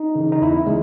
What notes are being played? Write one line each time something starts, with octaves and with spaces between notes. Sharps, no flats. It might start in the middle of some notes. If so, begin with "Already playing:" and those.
Already playing: D#4
C#3 E3
D#4
E2 E4
C#3 G#3